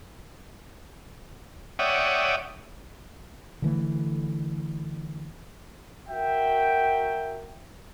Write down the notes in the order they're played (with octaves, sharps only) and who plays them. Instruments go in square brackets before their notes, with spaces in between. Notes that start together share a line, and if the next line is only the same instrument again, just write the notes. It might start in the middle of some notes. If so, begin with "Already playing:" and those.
[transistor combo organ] C#5 D5 E5 F#5 G5 D#6
[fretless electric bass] D3 E3 A3
[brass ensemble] F#4 A#4 E5 G5